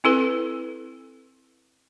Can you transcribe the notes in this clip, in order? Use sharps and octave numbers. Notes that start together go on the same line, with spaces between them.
C4 E4 A4 B4